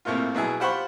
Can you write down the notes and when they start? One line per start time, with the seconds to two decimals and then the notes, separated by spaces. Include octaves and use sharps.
0.05 C2 A2 C3 A#3 F4
0.35 B2 F#3 E4 G#4
0.60 F4 G4 C5 F#5 B5 C#6